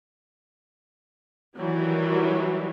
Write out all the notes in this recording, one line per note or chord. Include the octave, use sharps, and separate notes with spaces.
D#3 E3 F#3 G3